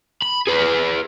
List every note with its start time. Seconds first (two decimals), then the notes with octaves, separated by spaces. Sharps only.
0.22 B5
0.47 G#4 B4